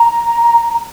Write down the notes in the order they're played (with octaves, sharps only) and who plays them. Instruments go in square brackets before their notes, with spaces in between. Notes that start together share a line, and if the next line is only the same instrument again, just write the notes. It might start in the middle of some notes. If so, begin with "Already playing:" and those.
Already playing: [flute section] A#5